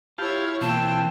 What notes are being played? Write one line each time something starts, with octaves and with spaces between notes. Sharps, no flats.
E4 F4 G4 C#5 F5 A5
B2 E3 A#3 C4 F4 G5 A5